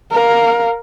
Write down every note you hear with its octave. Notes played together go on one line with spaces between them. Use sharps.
A#4 F5